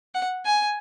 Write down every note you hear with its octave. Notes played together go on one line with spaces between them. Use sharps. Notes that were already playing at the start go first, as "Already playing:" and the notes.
F#5
G#5